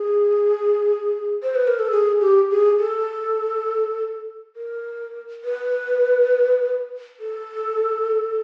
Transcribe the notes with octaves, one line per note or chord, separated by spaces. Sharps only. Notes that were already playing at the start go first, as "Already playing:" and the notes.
Already playing: G#4
C5
B4
A#4
A4
G#4
G4
G#4
A4
A#4
B4
A4